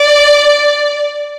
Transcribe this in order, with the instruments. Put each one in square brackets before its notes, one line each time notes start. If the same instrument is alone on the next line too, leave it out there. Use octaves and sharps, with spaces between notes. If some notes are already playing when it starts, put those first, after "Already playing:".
Already playing: [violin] D5